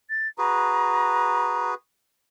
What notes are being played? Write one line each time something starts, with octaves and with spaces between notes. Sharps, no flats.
A6
F#4 G#4 B4 A#5